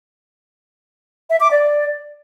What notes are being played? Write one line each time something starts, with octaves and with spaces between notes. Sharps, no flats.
E5
D6
D5